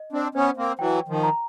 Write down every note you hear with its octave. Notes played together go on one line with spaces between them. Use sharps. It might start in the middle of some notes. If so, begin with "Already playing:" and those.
Already playing: D#5
C4 D4
B3 C#4 C5
A#3 C4
E3 F#3 G5
D#3 F3
A#5